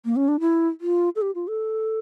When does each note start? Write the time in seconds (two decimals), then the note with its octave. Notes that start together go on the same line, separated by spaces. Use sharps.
0.05 A#3
0.16 C#4
0.28 D4
0.40 E4
0.81 F4
1.16 A4
1.22 G4
1.35 F4
1.48 A4